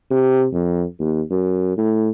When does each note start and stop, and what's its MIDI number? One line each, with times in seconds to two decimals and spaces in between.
0.11 0.46 48
0.53 0.84 41
0.99 1.21 39
1.31 1.72 42
1.77 2.09 45